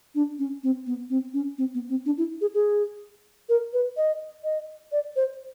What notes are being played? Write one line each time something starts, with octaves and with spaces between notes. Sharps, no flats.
D4
C#4
C4
B3
C4
C#4
C4
B3
C4
D4
E4
G#4
G#4
A#4
B4
D#5
D#5
D5
C5